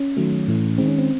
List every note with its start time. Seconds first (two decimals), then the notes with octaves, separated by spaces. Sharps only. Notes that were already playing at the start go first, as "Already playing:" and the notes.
Already playing: C#4
0.17 D#3 F#3 A3
0.48 A2 E3 A3
0.78 D#3 G#3 C4
0.88 C#4
0.98 C4